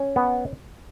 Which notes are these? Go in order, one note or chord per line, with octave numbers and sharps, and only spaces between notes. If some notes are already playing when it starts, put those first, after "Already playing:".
Already playing: C#4
B3